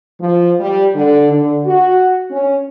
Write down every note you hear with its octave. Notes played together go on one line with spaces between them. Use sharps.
F3
G3
D3
D3
F#4
C#4